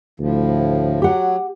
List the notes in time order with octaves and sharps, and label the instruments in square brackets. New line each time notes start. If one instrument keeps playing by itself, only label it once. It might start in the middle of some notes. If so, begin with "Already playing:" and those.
[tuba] D2 [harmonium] A2 F3
[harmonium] F#3 [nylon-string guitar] G4 F#5